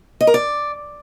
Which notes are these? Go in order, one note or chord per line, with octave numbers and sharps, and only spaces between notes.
D#5
A#4
D5